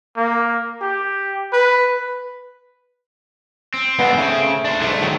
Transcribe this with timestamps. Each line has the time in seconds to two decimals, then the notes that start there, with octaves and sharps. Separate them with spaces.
0.16 A#3
0.82 G4
1.53 B4
3.74 C4
3.99 G#2 D3 B3
4.18 C#3 A3
4.65 D4 C5
4.82 C2 G#2 A3
5.02 D#3 F#3